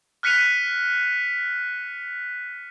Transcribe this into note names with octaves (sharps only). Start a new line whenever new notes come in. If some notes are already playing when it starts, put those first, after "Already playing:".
F6 F#6 B6 C#7 D#7 F7